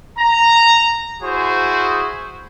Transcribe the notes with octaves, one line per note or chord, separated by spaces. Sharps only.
A#5
E4 F#4 G#4 C5